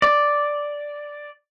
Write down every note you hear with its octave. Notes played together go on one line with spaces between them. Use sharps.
D5